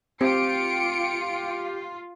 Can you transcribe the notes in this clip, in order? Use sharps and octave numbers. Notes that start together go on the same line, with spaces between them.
C4 F4 G4 C#7 D7